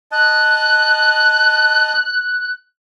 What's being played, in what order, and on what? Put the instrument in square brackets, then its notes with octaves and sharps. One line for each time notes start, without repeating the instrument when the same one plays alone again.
[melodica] D#5 A5 [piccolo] F#6